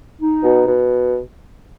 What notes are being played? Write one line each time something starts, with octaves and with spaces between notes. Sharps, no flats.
D#4
B2
B2